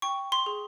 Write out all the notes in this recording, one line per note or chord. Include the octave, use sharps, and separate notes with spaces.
G5 C#6
C6
G#4